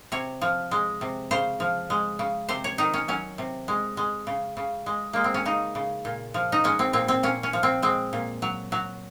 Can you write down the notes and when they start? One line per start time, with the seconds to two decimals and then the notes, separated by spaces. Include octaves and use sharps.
0.12 C3 C#5
0.41 F3
0.71 G#3
1.01 C3
1.31 C#3 C5
1.60 F3
1.90 G#3
2.19 C#3
2.49 C3 C5
2.64 C#5
2.78 D#3 D#4
2.94 C#4
3.08 F#3 C#4
3.38 C3
3.68 G#3
3.97 G#3
4.27 C#3
4.57 C#3
4.86 G#3
5.13 G#3 A#3
5.24 C4
5.34 C#4
5.45 C#3 D#4
5.75 C#3
6.05 A#2
6.34 F3
6.52 D#4
6.64 G#3 C#4
6.79 C4
6.93 A#2 C4
7.08 C4
7.23 A#2 C#4
7.43 C#4
7.53 F3
7.63 C4
7.82 G#3 C4
8.13 A#2
8.42 F#3
8.72 F#3